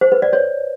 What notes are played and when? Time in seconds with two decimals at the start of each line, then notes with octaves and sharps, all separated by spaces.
0.01 C5
0.12 B4
0.22 D5
0.33 C#5